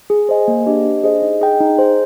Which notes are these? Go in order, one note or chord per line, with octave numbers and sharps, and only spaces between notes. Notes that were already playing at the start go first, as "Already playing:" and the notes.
G#4
C5 D#5 G#5
A#3
D4 G4 C5 D#5
D4
G#4 C5 D#5
D#4
G#4 D#5 G5
D#4
G#4 C5